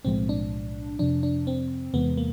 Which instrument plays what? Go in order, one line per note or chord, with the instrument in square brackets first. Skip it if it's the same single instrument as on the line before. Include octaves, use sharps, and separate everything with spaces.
[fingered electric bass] B1 A2 F3 G#3 [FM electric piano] C4
[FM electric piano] D4
[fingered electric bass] F2 C3 F3 [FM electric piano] D4
[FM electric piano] D4
C4
[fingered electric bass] E2 C3 E3 G#3 [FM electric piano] B3
[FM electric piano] A#3